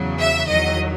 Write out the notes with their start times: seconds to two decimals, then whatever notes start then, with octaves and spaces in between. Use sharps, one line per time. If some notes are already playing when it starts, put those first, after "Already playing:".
Already playing: E2 C#3 F#3
0.19 E5
0.48 E2 D#3 F#3 D#5